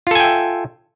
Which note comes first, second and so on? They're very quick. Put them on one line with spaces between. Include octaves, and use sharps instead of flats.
F4 A4 G#5 G5 E5